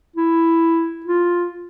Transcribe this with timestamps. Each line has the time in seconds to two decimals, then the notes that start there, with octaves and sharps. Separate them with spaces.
0.16 E4
1.06 F4